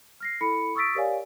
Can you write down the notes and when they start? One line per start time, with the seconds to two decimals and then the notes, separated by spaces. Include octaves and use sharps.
0.20 F6 A#6 C7
0.41 E4 A4 B5 C#7
0.75 C#6 D#6 E6 A6 B6 D7
0.95 G4 A#4 C#5 D5 F5 G#5